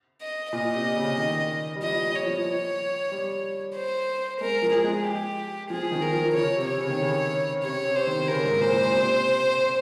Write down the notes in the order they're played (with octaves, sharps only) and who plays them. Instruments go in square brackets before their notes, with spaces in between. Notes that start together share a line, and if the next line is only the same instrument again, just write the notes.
[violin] D#5
[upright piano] A#2 [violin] D#5
[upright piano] C3
C#3
D#3
G3
[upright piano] F3 [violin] D#5
[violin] C#5
[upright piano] F3
G3
[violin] C5
[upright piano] G#3 [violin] A#4
[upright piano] F3
[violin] G#4
[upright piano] G#3
[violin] G4
[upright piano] F3 [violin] G#4
[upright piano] D#3
[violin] A#4
[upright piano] F3
[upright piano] C#3 [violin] C#5
[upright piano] C3
[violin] C#5
[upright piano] C#3
D#3
C#3
[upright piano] C3 [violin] C#5
[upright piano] C3
[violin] C5
[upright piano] D#3
[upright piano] C#3 [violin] A#4
[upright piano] G#2
[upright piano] A#2 [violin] C5
[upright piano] A#2
C3